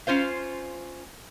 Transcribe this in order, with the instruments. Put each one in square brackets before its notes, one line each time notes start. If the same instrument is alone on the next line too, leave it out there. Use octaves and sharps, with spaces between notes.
[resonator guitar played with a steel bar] C#4 F4 C5 F5